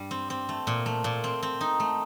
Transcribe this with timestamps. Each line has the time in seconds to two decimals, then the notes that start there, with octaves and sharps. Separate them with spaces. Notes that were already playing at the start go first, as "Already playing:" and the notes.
Already playing: G2 G3
0.11 C4
0.30 C4
0.49 A3
0.67 A#2
0.86 A3
1.04 A#2
1.24 C4
1.43 C4
1.61 D#4
1.80 A3